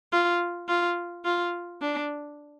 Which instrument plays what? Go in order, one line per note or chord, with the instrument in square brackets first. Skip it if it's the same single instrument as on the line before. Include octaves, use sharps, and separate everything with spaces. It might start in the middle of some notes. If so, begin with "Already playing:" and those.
[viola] F4
F4
F4
D4